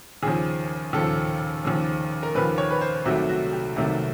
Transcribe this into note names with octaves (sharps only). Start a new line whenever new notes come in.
D#2 C#3 F3 G#4
D#2 C#3 F3 A4
D#2 C#3 F3
A#4
D#2 C#3 F3 B4
C#5
B4
C5
C2 C3 D#3 F#3 A3 F#4
F#4
G4
C2 C3 D#3 F#3 A3